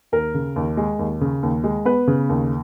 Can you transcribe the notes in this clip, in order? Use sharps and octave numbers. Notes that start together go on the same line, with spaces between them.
D#2 A#4
C#3
D#2
G#3
D#2
C#3
D#2
G#3
B3 B4
C#3
D#2